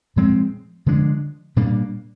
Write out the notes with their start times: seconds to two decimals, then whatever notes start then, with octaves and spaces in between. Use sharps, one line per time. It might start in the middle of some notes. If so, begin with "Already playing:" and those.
0.16 A#2 F3 G#3 C4
0.86 D3 F3 G#3 D4
1.56 A#2 G3 A#3 D4